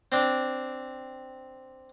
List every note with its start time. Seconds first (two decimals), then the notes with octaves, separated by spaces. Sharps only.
0.12 C4 D4